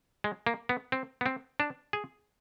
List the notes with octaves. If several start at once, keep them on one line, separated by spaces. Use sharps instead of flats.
G#3
A#3
B3
C4
B3
C4
D4
G#4